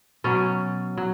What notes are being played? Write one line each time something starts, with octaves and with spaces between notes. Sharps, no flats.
B2 F#3 C#4
F#3